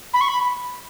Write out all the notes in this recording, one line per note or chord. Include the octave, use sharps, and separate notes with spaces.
B5
C#6
B5